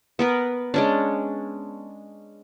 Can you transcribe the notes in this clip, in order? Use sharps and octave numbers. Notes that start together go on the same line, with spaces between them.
B3 A#4 B4
G#3 C#4 D4